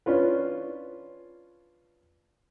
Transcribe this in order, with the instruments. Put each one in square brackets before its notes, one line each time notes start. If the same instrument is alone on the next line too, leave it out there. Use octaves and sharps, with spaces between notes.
[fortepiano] C#4 D4 F4 B4